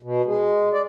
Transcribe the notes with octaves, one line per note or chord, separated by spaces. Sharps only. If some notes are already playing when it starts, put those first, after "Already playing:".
B2
G#3
D5